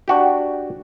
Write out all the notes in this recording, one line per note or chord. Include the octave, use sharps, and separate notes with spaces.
D4 F#4 G4